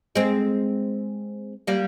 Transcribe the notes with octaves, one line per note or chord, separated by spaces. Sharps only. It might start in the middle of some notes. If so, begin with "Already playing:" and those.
G#3 C4
G3 A#3